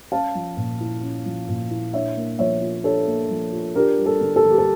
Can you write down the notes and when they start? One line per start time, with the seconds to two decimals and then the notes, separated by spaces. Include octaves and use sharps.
0.12 C#4 F5 A5
0.35 F3
0.57 A#2
0.80 E4
1.03 C#4
1.26 F3
1.49 A#2
1.71 E4
1.93 D4 C#5 E5
2.17 A#3
2.39 F3 C#5 E5
2.61 F4
2.84 D4 A4 C#5
3.07 A#3
3.30 F3
3.52 F4
3.75 D4 G4 A#4
3.98 G3
4.06 A4
4.21 D3
4.36 A4
4.44 D3
4.51 G4
4.58 A4